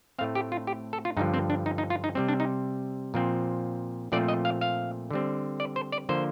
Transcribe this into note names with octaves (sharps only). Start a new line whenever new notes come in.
A2 A3 C4 F5
G4
F4
G4
A4
F4
G2 D3 F3 D#4
C4
D4
D#4
D#4
F4
D#4
C3 G3 C4
D4
D#4
A#2 F3 C4
A#2 F3 A3 C4 D5
D#5
F5
F5
D3 G3 C4
D5
C5
D5
D3 F3 A#3 C5